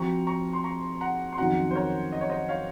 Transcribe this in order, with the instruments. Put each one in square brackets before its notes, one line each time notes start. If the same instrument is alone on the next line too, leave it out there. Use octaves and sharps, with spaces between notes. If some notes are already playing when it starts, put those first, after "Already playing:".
Already playing: [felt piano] F3 C4 F#4 [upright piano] A#5 C#6
[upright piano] A#5 C#6
C6
A#5 C#6
F#5 A#5
C6
[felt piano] F2 D#3 F#3 C#4 F#4 [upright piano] F#5 A#5
[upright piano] C5
A#4 C#5
D#5
C#5
C5 D#5
C#5 F5